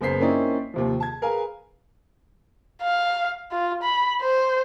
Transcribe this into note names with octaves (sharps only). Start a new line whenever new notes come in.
F#1 F#2 B3 C5 B6 C7
A#3 C4 C#4 D#4 E4 D5
D#2 C3 F3
A5 G#6
G#4 A#4 B4 F5 G#5
F5
F4
B5
C5